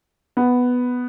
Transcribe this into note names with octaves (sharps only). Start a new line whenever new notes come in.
B3